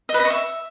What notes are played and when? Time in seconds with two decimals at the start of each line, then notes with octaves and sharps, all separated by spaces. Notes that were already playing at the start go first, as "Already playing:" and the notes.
0.09 D#5
0.14 B4
0.20 D#5
0.25 C#6
0.30 E5